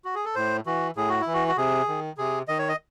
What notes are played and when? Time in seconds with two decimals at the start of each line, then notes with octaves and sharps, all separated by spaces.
0.05 F#4
0.15 G#4
0.25 A4
0.35 A2 C5
0.66 E3 F#4
0.96 A2 G#4
1.09 F#4
1.21 E4
1.27 E3
1.34 F#4
1.48 F#4
1.57 C3 G#4
1.88 D#3
2.18 C3 G#4
2.48 D#3 D#5
2.59 C#5
2.69 D#5